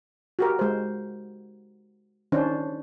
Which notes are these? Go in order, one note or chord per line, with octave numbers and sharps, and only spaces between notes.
F#4 G4 A#4
G#3 C5
D#3 C#4 D4 C5